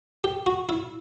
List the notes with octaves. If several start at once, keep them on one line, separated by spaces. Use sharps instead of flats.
G4
F#4
E4